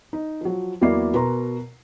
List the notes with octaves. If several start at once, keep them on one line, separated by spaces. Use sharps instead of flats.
D#4
F3 F#3
E2 F#3 A#3 E4 D5 C7
B2 A#4 B4 A#5 C6